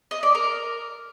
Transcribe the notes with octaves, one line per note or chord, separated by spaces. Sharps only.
D#5
D5
A#4